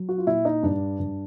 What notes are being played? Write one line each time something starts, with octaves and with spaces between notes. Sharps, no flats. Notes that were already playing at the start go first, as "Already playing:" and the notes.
Already playing: F#3
F#4
F4
A#2 E4
D#4
G2 D4
G2